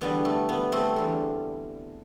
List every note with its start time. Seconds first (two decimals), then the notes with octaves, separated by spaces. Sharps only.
0.01 E2 D3 G3 B3
0.25 A3
0.49 B3
0.72 A3 C4
0.96 E2 D3 G3